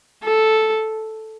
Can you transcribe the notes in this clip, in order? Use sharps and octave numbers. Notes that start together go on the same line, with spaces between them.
A4